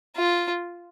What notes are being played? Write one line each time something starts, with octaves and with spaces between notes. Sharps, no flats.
F4